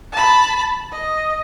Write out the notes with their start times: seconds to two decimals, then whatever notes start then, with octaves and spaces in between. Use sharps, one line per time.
0.12 A5 B5
0.92 D#5